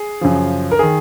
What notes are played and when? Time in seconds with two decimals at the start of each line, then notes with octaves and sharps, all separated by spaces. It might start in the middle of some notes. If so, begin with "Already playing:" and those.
Already playing: G#4
0.21 F#2 C#3 F3
0.72 A#4
0.79 D#3 G#4